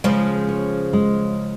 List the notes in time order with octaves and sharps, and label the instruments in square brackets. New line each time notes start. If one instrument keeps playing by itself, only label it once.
[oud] C#3 F3 [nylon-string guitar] G#3
[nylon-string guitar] C#5
G#3